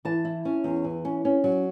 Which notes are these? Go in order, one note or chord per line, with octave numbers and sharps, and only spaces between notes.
E3 A5
E4
C#4
E2
E3
C#4
C#4
F#3